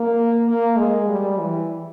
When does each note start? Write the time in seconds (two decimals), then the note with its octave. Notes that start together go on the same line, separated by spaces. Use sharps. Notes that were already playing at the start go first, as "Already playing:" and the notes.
Already playing: A#3
0.45 A#3
0.77 G#3
1.08 G3
1.40 E3